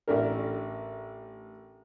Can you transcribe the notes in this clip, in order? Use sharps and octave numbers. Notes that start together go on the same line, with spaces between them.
A1 A3 D4 A#4